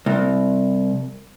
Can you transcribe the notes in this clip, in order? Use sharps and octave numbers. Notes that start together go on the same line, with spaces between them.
C2